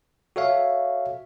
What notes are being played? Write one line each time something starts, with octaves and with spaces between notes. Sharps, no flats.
F#4 A4 C#5 E5 F5